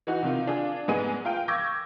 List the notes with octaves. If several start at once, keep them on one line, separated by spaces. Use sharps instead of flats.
E3 D#4 F#4
C3 D#3 D#4 F4
D4 F4 G#4
G#2 G#3 B3 G#4 D#7
F4 F5 G5
C#6 D6 E6 G6 G#6 A#6